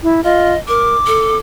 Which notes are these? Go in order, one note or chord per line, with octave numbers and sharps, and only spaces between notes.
E4
F4 D#5
A#4 D6
A4